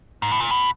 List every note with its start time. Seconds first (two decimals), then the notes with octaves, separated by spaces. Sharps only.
0.22 G#2
0.32 A2
0.40 A#2
0.51 B2